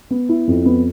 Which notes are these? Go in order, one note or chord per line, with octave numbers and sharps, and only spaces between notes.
B3
E4
F2
B3